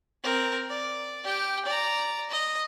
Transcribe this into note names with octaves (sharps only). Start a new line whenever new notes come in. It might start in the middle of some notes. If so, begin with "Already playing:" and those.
C4 A#4
D5
G4 G5
D5 A#5
D#5